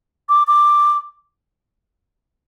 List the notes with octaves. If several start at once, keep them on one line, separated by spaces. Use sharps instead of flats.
D6
D6